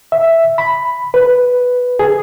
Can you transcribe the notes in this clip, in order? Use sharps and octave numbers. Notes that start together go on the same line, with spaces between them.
E5
B5
B4
G#4